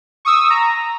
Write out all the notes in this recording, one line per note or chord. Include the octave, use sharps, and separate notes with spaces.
C#6 D#6 E6
A#5